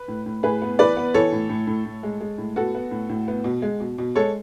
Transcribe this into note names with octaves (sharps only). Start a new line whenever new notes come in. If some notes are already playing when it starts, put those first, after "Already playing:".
Already playing: B4
A2
A2
A2 G#4 B4
B3
E3 B4 D5
B3
E3 A4 C#5
A2
A2
A2
A2
G#3
G#3
A2
B3 F#4 A4
B3
A2
A2
B3
B2
G#3
B2
B2
G#3 A4 C#5